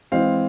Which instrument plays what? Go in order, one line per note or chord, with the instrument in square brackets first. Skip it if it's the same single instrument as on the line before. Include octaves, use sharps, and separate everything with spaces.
[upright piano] E3 G#3 C4 F5